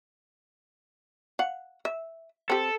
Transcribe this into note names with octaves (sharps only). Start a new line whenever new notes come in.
F5 F#5
E5
C4 G4 A4